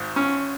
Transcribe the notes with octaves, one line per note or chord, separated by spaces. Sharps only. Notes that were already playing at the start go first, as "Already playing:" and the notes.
Already playing: G#1 G#2
C#4